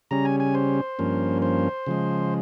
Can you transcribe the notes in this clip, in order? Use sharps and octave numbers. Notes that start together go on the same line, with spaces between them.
C#3 G3 C#4 A#5
G#5
G#5
C5
G2 F3 A#3 C#4
C5
C#3 F3 G#3